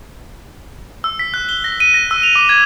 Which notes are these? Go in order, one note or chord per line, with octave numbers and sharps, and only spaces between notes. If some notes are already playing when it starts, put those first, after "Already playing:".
E6
B6
F#6
G7
A#6
D#7
A#6
E6
F7
D6
G#6